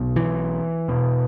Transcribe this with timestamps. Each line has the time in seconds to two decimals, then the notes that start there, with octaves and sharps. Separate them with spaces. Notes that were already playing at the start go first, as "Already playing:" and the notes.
Already playing: B1 B2
0.16 E3
0.88 E1 E2 B2